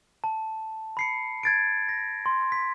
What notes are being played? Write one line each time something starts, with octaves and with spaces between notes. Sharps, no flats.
A5
B5 C7 C#7
G#6 A6 D7
A#6
C6
B6